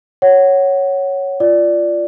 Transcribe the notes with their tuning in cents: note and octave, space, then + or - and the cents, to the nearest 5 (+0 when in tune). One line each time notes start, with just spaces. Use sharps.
C#5 +0 F#5 +10
F4 -15 D5 +0